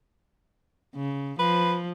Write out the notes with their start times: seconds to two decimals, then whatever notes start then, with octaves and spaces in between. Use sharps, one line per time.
0.96 C#3
1.39 F3 B4